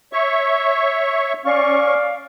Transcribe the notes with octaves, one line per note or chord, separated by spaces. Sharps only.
C#5 E5 C#6
C#4 D5 F5 C#6